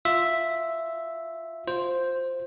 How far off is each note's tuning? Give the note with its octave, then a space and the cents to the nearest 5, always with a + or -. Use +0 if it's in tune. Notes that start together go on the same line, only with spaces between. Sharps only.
F4 +0 E5 +0
F4 +20 C5 +0